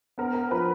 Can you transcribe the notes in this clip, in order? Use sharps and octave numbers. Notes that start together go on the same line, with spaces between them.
B3 A#4 A#5
A#4 A#5
F3 B4 B5